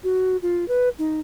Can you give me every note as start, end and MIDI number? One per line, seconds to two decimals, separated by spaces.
0.04 0.37 66
0.42 0.65 65
0.68 0.89 71
0.99 1.20 63